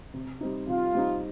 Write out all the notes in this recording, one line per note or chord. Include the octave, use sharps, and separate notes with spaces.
C3
G3 C4 D#4
C3 F4
G3 C4 D#4